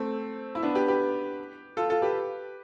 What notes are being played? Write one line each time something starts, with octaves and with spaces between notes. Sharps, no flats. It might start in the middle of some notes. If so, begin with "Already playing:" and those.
Already playing: A3 C4
E4
B3 D4
G4 B4
G4 B4
F4 A4
F4 A4
G4 B4